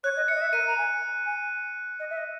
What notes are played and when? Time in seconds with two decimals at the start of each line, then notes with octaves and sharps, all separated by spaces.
0.04 C#5 F#6
0.16 D#5
0.28 E5 C#7
0.35 D#5
0.41 E5
0.52 A#4 D#7
0.66 A#5
0.77 G#5
1.26 G#5
1.99 D#5
2.10 E5
2.17 D#5